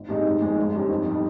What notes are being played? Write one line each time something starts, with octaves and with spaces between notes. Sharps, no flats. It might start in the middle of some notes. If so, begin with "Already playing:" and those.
Already playing: G#1
G2 D#3 G#3 D#4
F1
F2 D#3 G#3
G#1
G2 D#3 G3 C#4
F2
D#3 G3